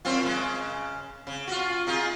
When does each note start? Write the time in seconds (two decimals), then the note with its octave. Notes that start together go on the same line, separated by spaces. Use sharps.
0.05 F#2 C4 F4
0.23 C#3 G#3
1.27 C#3
1.47 F4 F#4
1.87 D#4 F4 G#4